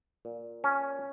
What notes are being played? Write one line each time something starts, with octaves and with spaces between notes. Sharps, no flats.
A#2
C#4